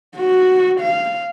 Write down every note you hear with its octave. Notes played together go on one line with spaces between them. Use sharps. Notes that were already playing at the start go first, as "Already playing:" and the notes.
F#4
F5